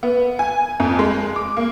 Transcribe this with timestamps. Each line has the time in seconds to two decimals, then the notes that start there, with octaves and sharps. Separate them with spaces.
0.03 B3
0.39 G#5
0.80 F2
0.99 G#3
1.36 D6
1.57 A#3